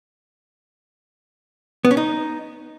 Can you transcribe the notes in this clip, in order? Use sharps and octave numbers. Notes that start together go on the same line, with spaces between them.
B3
C#4
D#4